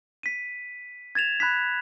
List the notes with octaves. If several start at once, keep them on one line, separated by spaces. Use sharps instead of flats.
B6 D#7
G#6 A6 E7 F7
B5 F#6 G#6 B6